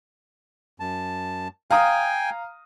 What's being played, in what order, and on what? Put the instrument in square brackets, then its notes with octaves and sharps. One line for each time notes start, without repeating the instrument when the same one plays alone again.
[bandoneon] F#2 A5
[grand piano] F5 A#5 D#6 [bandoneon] G5 G#5